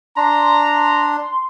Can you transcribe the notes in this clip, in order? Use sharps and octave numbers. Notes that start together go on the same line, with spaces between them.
D4 A#5 C6